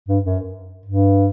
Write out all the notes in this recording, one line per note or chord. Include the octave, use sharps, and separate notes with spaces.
G2
F#2
G2